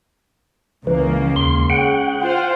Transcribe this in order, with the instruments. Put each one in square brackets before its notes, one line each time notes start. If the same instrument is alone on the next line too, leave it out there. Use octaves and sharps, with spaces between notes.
[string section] C#2 C#3 A#3 [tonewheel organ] E3
[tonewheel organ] D#2 C6
[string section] C#3 [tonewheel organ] F#5 G5
[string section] F4 C5